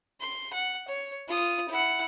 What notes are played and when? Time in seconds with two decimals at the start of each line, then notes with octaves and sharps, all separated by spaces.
0.21 C6
0.53 F#5
0.88 C#5
1.28 F4 D#6
1.69 E4 F#5